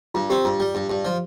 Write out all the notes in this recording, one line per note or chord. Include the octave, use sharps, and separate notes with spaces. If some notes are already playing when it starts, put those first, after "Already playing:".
G2 F4
C4 G4
G2 F4
G3
G2
G2
F3